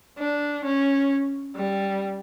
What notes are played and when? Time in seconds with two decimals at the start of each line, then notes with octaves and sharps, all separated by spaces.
0.18 D4
0.65 C#4
1.56 G3